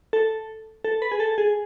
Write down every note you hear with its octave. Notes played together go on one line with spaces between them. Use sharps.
A4
A4
B4
G#4
A4
G#4